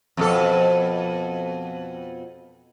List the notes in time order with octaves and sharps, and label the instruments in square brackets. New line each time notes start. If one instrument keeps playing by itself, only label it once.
[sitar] F2 B2 A4